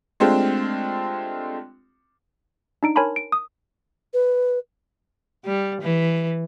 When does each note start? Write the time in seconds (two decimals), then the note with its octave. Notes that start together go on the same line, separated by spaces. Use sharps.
0.20 G#3 A3 C4 D4 F4 G4
2.83 D4 D#4 D7
2.96 A#4 C#5 G#5 A5 B5 C6
3.16 D7
3.32 D#6
4.13 B4
5.45 G3
5.82 E3